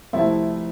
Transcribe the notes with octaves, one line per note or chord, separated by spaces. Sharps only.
C2 C3 F3 A3 C4 E4